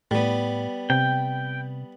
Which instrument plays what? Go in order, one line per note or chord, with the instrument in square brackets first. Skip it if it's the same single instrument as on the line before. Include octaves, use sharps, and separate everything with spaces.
[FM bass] A2 [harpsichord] G3 B3
[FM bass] C3 [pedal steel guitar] G5